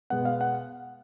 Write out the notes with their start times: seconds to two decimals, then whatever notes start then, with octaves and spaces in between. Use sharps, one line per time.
0.10 B2 G#3 B3 F#5
0.25 F5
0.41 F#5